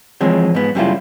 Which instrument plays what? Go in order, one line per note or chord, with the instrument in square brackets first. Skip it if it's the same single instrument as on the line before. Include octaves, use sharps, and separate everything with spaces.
[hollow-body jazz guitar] E3 F3 G#3 C4 C#5
G#2 B3
F#2 C#3 G3 A#3 E4 F4